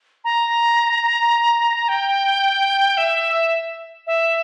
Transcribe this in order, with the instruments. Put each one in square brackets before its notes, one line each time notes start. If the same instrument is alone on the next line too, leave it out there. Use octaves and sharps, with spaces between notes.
[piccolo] A#5
G5
E5
E5